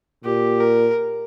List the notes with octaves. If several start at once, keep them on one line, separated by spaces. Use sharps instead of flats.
A#2 G4
A#4